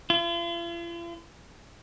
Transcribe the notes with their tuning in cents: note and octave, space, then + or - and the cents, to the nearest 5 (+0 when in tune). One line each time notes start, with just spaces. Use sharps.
F4 -45